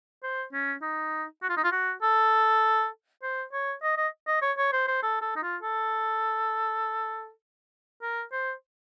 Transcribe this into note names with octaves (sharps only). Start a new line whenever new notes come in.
C5
C#4
D#4
F#4
F4
D#4
F4
F#4
A4
C5
C#5
D#5
D#5
D#5
C#5
C#5
C5
C5
A4
A4
D#4
F4
A4
A#4
C5